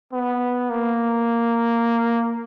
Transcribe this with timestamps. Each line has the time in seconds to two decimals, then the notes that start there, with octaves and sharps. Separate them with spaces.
0.13 B3
0.70 A#3